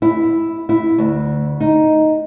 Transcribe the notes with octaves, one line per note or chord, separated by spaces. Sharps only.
E4
E4
D2
D#4